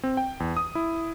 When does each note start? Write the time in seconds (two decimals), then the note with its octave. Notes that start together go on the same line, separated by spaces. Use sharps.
0.03 C4
0.17 G5
0.40 E2
0.57 D#6
0.75 E4